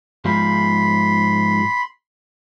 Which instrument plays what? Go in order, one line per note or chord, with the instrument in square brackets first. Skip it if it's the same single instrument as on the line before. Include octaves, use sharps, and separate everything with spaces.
[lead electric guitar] G#2 F3 [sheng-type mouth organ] B5 C6